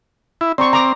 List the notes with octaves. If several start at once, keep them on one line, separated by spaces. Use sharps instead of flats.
E4
C4 D5 A#5 C#6
A#5 D6